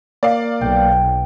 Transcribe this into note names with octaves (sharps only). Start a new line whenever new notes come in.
A#3 D5 F5
B1 G5